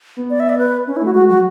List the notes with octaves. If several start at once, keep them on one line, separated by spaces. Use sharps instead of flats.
B3
D5
E5
D5
B4
C#4
E4
A3 F#4
G#3 F#4
F#3 F#4